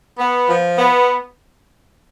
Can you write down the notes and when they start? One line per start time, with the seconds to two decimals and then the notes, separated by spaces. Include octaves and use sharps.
0.18 B3
0.48 F3
0.78 B3